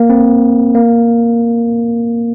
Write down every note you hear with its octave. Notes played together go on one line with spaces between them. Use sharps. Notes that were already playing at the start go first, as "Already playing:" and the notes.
Already playing: A#3
C4
A#3